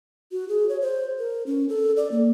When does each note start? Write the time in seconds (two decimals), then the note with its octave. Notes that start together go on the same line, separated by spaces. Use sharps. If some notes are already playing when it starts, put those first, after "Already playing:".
0.32 F#4
0.49 G#4
0.69 C#5
0.81 C5
1.19 A#4
1.47 C#4
1.69 A4
1.97 D5
2.12 A#3